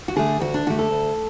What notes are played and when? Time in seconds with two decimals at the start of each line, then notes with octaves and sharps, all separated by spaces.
0.08 F#4
0.16 D3 A3 G#4
0.40 D2 F#4
0.54 D4
0.66 D3 A3 F#4
0.79 A4
0.91 D2